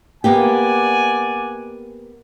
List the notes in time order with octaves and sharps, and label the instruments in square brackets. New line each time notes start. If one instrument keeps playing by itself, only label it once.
[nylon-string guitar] A#3 B3 G4 [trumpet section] D5 F#5 G#5